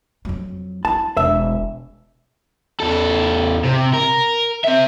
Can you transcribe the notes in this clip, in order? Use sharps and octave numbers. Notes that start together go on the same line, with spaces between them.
F2 F#3
E4 A5
E1 E5
E2 A4
C3
A#4
C4 E5